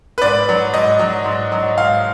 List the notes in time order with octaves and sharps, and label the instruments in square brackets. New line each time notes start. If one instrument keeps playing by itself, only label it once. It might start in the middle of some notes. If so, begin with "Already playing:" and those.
[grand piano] B4
G#2 D5
F#3
G#2 D#5
F#3
G#2
F#3
G#2 F5